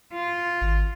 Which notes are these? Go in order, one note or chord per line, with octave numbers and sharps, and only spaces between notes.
F4
G#1